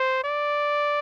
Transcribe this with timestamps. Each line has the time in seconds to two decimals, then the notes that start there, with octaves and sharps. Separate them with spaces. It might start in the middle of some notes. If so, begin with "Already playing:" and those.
Already playing: C5
0.24 D5